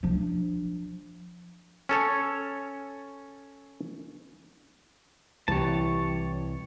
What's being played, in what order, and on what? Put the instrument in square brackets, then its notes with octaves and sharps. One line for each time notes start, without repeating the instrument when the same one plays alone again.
[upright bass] F3 D4
[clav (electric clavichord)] C#4 A4 C#5
[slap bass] C2 [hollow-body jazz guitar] E3 G4 [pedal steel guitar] C#5 A5